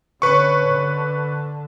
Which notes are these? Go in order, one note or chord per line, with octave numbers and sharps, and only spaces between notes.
D3 C#4 B4 C#6
D3